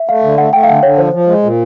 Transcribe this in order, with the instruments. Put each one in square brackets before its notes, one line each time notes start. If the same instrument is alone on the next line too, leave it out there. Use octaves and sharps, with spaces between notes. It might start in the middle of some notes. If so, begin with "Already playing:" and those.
Already playing: [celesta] E5
[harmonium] A3 [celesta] F5
[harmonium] D3
[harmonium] A3 [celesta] F#5
[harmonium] A3 [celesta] G5
[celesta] F5
[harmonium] D3 [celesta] F#5
[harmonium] D3 [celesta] C#5
[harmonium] F3 [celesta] C5
[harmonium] F3
G#3
A#2